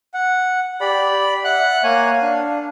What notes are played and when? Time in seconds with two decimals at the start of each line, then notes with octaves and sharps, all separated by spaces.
0.14 F#5
0.81 G4 D5 B5
1.44 E5 F#5 F#6
1.84 A#3 C#5 F5 G#5
2.22 D4